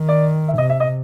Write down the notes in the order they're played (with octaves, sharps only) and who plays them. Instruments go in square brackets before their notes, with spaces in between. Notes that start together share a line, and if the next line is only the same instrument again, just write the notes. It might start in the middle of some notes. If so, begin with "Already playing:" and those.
Already playing: [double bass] D#3
[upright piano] D5
E5
[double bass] C3 [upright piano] D#5
[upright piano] E5
D#5